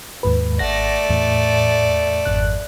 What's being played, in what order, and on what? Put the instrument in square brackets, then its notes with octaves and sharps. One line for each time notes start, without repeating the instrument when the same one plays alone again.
[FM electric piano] D#2 G#2 B4
[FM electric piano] G#1 F#5 A#6 [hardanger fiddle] A3 D5
[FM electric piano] E2 A2
G#1 F2 F#6